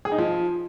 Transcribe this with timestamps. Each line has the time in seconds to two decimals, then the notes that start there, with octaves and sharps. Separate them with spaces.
0.05 G#4
0.12 D#4
0.18 F3